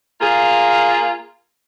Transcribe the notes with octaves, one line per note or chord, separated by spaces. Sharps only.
A#3 F4 G#4